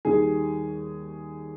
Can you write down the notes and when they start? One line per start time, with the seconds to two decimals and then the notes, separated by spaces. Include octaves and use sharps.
0.05 D#2 D#3 G3 G#4